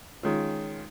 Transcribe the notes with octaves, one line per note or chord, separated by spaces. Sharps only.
D#3 G#3 C#4 F4